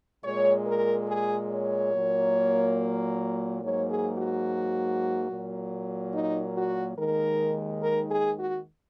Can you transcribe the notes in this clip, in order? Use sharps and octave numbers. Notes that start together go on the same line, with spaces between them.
A#2 G#3 C#5
A#4
G#4
C#5
A#2 F#3 A#3
G#2 F#3 A#3 C#5
G#4
F#4
A#2 F#3 A#3
D#4
F#4
D#2 D#3 G#3 A#4
A#4
G#4
F#4